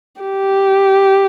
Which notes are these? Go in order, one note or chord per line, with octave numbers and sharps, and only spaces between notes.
G4